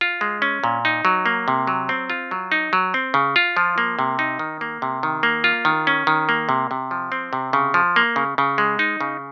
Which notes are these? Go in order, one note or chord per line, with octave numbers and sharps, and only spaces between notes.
F4
G#3
C#4
A#2
D#4
F#3
A#3
C3
F#3
C4
F4
F#3
D#4
F#3
C4
C#3
F4
F3
A#3
C3
D#4
D#3
A#3
C3
D#3
A#3
F4
D#3
C#4
D#3
A#3
C3
C3
F3
C4
C3
C#3
F3
A#3
C#3
C#3
G#3
D#4
C#3